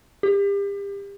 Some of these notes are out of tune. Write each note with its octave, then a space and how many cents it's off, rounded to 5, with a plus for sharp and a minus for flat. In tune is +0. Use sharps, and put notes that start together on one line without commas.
G4 +35